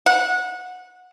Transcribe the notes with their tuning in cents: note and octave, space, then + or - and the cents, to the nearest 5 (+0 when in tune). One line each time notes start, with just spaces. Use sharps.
F#5 -20